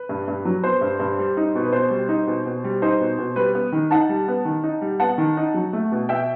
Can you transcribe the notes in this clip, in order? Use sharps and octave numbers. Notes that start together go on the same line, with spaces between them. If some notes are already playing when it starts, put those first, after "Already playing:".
Already playing: B4
G2
G2
F#3
B3 C5
G2
G2
G3
D#4
B2
B4
B2 C5
G3
D#4
B2
B2
G3
D#4 C5
B2
B2
G3 B4
B3
D#3
D#4 F#5 A5
G3
B3
D#3
D#4
G3
B3 F#5 A5
D#3
D#4
F#3
A3
B2
B2 E5 G5